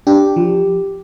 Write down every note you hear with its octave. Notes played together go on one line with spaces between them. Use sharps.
D4 G4
F3